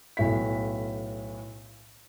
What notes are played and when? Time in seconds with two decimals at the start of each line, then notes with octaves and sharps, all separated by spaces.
0.17 B1 A2 B6